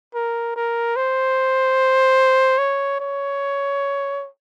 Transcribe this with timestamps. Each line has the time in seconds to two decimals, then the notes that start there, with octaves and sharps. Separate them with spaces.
0.14 A#4
0.56 A#4
0.96 C5
2.58 C#5
3.00 C#5